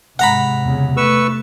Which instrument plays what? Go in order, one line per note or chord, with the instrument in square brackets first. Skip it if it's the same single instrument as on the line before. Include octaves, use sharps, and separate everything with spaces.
[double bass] G#2 [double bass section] C3 [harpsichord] F#5 A#5 B5
[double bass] E2 C#3
[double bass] A3 [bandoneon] B4 C#6 E6